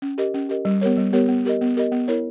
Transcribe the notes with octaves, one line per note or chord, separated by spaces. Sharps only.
C#4
G4 A#4 D#5
C#4
G4 A#4 D#5
G3
B3 G4 A#4 C#5
G3
B3 G4 A#4 C#5
B3
G4 A#4 D#5
B3
G4 A#4 D#5
B3
E4 A#4 C#5